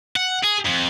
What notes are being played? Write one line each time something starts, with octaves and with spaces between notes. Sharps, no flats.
F#5
G#4
F2